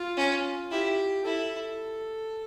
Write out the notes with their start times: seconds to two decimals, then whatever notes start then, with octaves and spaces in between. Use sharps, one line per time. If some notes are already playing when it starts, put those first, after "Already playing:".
Already playing: F4
0.17 C#4
0.71 E4 G4
1.25 E4 A4